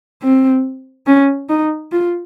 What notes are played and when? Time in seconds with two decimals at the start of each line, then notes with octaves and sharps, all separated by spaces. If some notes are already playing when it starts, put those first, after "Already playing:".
0.23 C4
1.07 C#4
1.49 D#4
1.92 F4